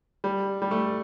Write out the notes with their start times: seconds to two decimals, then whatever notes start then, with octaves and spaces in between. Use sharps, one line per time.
0.24 G3
0.62 G3
0.71 A3